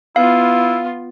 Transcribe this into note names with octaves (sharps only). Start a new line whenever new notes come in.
B3 E4 F4 F5